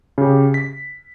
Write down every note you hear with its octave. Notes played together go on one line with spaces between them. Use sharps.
C#3 G4
B6